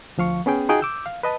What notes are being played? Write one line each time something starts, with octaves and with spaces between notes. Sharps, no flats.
D2 F3 F5 C#6
B3 C#4 G#4 G5
D#4 F4 F#4 G#4 F#5 G5
D6 E6 G6
F5
B4 D#5 A5